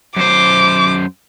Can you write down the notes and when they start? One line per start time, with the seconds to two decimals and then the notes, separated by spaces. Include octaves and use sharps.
0.16 F#2 C5 D6